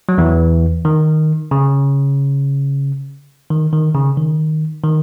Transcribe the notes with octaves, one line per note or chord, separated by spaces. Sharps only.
F#3
E2 E3
D#3
C#3
D#3
D#3
C#3
D#3
D#3